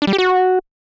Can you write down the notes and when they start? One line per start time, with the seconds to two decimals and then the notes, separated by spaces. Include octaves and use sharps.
0.02 D4
0.07 G3
0.13 G4
0.18 F#4